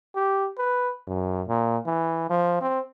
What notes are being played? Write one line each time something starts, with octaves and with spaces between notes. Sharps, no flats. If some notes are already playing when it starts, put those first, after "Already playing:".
G4
B4
F#2
A#2
E3
F3
C4